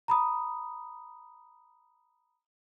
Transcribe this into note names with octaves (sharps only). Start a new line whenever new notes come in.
A#5 B5 D#6